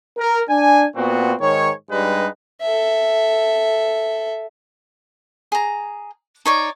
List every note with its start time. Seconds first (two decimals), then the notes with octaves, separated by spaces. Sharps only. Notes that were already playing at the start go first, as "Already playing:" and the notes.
0.18 A#4
0.50 D4 G#5
0.96 A#2 B3 C4 F#4
1.41 G#2 D#3 C#5
1.91 G2 G3 G#3 D#4 B4
2.61 A4 E5
5.52 G#4 A#5
6.45 D#4 C#5 D5